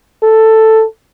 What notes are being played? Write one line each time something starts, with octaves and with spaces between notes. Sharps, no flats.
A4